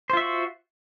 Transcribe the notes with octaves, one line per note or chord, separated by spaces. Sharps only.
F4 F#4 C5 E5